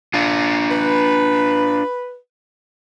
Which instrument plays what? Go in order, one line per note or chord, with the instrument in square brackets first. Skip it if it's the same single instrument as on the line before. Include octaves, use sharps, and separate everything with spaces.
[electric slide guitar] D4 F4
[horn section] B4